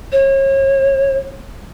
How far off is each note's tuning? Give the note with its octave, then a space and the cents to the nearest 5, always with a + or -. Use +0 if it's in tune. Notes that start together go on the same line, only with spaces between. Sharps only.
C#5 -35